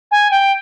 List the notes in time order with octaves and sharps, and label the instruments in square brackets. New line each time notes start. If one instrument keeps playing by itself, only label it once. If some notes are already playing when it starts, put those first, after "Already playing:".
[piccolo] G#5
G5